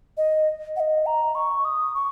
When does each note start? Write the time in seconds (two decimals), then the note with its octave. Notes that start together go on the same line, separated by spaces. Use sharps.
0.17 D#5
0.76 F#5
0.80 D#5
1.06 A#5
1.35 C#6
1.65 D#6
1.95 C#6